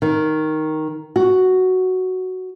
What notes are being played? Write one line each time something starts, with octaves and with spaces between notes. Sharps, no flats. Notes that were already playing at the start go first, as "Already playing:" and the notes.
D#3
F#4